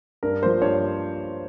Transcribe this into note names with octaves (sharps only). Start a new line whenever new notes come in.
G2 A#4
F3 A#3 C5
G2 C#5